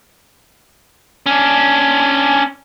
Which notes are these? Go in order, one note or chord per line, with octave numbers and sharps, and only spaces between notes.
C#4 D4